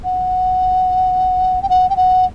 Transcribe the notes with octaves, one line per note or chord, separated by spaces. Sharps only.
F#5
G5
F#5
G5
F#5